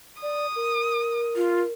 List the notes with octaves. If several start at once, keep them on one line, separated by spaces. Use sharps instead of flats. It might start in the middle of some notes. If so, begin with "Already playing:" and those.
D5 D#6
A#4
F4